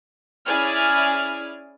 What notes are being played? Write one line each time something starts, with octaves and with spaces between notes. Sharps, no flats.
C#4 E4 G#4 D5 G#5 F6